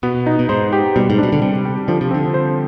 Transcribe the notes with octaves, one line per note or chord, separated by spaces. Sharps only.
B2 B3
D#4
B2
G#2 C5
G4
B2 G3
G#2
B2 D4
D3
C3 G3
G4
D3 F3
C3
D3 C4
C5